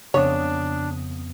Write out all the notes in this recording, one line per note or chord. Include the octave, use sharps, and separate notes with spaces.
F2 C#3 B3 D4 C#5 D#6